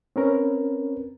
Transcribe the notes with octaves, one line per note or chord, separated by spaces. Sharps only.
C4 C#4 A#4 B4